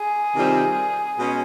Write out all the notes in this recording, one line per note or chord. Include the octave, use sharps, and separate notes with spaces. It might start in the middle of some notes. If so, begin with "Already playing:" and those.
Already playing: G#4
C3 D#3 G3 C4 F4
B2 G#3 C#4